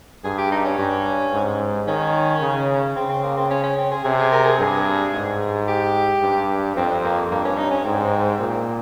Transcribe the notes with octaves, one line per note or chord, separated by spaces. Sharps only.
G2 G#4
G4
D#4
C#4
G2
G#2
D#3 C#4
C#3
C#3 C4
C4
A#3
C4
C#4
C#4
C4
G#4
C3 G#4
G#4
A#4
G#4
G2 G#4
G#2
G4
G2
F2 C4
A#3
G2 A#3
C#4
D#4
C#4
G#2 C4
A#2